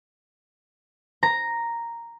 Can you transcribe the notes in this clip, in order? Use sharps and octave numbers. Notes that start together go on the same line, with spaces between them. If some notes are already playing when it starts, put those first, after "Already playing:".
A#5